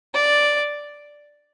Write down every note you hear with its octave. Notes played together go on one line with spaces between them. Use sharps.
D5